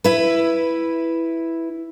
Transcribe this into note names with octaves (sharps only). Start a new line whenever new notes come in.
E4 B4